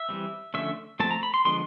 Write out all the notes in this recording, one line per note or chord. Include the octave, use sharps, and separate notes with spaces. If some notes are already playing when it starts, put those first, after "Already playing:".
Already playing: E5
E3 G3 C4
D3 F3 A3 C#4 E5
F3 A3 C4 A5
A#5
B5
C6
D3 F3 G#3 B3 C6